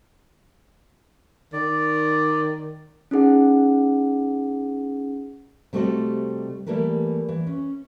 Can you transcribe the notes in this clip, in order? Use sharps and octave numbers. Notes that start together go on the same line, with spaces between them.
D#3 D5
C#4 D#4 G#4 F#5
C3 G3 A3 F#4 C5 D#5
E3 G3 A3 A#3 B4
E3
C#4